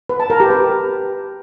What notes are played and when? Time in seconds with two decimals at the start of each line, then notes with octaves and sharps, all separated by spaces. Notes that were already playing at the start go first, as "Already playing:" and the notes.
0.10 B4
0.20 A5
0.30 A#4
0.40 G4
0.50 B4